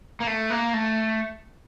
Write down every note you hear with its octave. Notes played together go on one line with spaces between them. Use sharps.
A#3
A3
A#3
A3